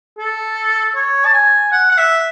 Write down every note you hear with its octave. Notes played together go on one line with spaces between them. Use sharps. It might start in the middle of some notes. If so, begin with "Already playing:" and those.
A4
C#5
A5
G#5
F#5
F#5
E5